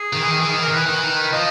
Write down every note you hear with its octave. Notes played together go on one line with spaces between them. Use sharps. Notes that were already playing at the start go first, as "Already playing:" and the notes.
Already playing: G#4
D#3
E3
D#3
E3
D#3
E3 A#4
D#3
E3 B4
D#3
E3
D#3
F3 D#5